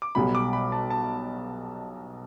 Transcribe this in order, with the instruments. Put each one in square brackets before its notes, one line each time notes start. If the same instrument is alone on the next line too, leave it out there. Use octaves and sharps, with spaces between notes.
[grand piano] D6
[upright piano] B1 B2 G3 [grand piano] B5
[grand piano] D6
B5
A5
A5